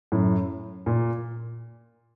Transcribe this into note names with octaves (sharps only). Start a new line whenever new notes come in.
F#2 A2
A#2